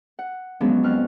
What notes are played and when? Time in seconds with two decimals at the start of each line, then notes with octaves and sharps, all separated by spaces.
0.19 F#5
0.61 F3 F#3 G#3 B3 C#4 D4
0.83 F2 F6 F#6